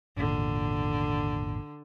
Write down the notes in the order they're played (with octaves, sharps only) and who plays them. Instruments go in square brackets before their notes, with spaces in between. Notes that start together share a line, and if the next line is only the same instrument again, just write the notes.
[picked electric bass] G#1 E2 A#2 [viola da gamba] D3